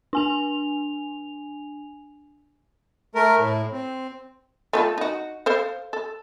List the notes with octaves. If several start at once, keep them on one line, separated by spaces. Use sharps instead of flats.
D4 G#5 F7
A3 A#4
A2
C4
A3 F4 A4
D#4 F#4
A4 C5 F5
A4